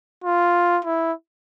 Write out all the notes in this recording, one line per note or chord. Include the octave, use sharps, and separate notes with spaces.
F4
E4